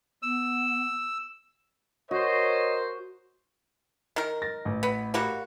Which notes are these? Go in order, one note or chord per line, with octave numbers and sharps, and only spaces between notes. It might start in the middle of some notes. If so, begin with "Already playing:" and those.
B3 E6
F#4 A#4 C5 C#5 D#5
D#3 A#4
A6 A#6
A1
B3
G3 A#3 F#4